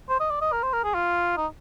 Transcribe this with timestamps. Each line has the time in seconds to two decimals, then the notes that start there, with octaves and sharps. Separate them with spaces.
0.09 C5
0.20 D#5
0.31 D5
0.41 D#5
0.52 A#4
0.63 C5
0.73 A#4
0.84 G#4
0.95 F4
1.37 D#4